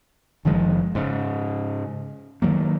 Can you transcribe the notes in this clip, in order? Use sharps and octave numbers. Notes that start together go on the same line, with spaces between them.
F#1 D#3 F3 G#3
G#2 C#3
D#3 F3 F#3 A#3